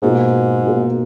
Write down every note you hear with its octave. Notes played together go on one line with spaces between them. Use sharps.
G#2 B2 A#3 F4 G#4
B2 A#3 F4 G#4